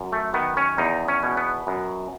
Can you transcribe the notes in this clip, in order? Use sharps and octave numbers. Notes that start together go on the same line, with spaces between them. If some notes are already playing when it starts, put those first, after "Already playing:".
Already playing: F#2
A3
D#3 B3
C#4
E2 D#4
C#4
B2
B3
F#2